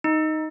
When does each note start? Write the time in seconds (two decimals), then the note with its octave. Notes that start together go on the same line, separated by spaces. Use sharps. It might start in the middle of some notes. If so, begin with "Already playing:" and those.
0.04 D#4